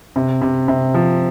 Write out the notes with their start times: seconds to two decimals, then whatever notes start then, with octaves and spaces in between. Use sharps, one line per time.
0.16 C3
0.42 C3
0.68 C3
0.94 F3